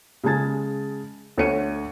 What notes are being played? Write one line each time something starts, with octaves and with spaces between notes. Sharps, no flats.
C#3 G#3 A5 G#6 A6
D2 C#5 C#7 D#7